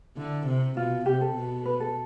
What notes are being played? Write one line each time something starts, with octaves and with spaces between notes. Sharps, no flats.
D3 E4
C3
B2 F4
C3 G4
A4
B2
B4
A4